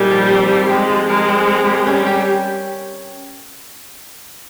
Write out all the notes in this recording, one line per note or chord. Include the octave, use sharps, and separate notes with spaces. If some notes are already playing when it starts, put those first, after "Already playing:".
Already playing: A#2 G3 D#4
F3
C4
F3
G#3 G4
F3
G#3 A#4
C4
A#4
G4
G3 C#4
G4